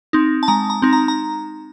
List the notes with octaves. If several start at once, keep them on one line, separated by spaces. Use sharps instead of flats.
C4 D#4
A5
G#3 A#5
A#5
C4 D#4
A#5
A#5